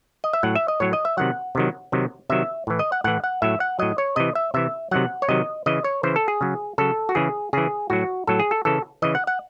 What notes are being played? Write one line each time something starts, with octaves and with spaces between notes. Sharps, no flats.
D#5
E5
A2 F#3 F#5
E5
D#5
A2 F#3 C#5
D#5
E5
C3 D#3 F#3 F#5
C3 D#3 F#3
C3 D#3 F#3
C3 D#3 F#3 E5
A2 E3
D#5
F#5
A2 E3 F#5
F#5
A2 F#3 E5
F#5
A2 F#3 D#5
C#5
C3 E3 D#5
E5
C3 E3 E5
C3 D#3 F#3 F#5
C#5
C3 D#3 F#3 D#5
C#3 E3 D#5
C#5
C#3 E3 C5
A4
G#4
C#3 F#3
C#3 F#3 A4
F#4
C#3 E3 G#4
C#3 E3 G#4
A2 F#3 F#4
A2 F#3 A4
G#4
A4
C#3 E3 A4
C#3 E3 D#5
F#5
F#5